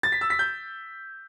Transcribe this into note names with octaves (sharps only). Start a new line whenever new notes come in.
A6
B6
E6
B6
G6